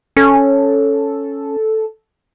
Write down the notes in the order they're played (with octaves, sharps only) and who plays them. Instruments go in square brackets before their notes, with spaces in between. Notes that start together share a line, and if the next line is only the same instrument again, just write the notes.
[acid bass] C#4 [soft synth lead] A4